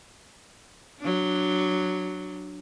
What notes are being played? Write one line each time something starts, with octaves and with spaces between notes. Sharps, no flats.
F#3 D4